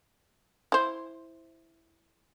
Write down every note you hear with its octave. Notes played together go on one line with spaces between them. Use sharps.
E4 C5